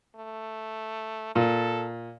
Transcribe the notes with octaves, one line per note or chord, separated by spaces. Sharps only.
A3
A#2 A4